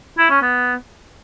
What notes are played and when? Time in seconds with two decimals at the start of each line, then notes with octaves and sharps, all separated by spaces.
0.18 E4
0.30 C#4
0.42 B3